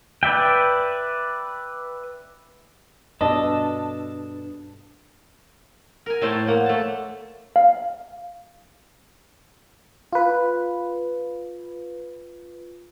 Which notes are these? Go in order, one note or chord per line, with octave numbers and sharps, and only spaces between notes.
B4 D5 E5 G5
G2 B2 D4 A4 B4 D#5
A#4 G#5
A2 A3 C5 C#5 A5
A#3 F#5
A3 A5
F5
F4 B4